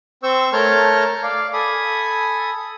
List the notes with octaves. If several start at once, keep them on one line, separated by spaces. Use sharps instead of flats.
C4 C5 C#6 E6 G6
A3 A#4 C#5 A5 F6 G6
D5 F5
A4 G#5 B5 D#6